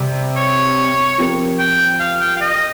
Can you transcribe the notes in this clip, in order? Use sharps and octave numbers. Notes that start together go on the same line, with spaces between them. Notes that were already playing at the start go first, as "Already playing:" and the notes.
Already playing: C3 G3 C4 G4
C#5
F3 C4 G4 A#4
G5
F5
G5
F5
D#5